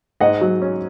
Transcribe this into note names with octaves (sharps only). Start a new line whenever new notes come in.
G#2 D#5 F#5
F#3
C#4